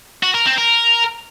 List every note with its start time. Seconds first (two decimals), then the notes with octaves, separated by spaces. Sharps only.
0.23 F#4
0.34 A#4
0.46 C4
0.58 A#4